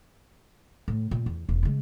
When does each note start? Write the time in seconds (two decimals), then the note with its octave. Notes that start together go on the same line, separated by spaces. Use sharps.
0.88 A2
1.11 A#2
1.26 E2
1.49 E1
1.63 C#3 G#3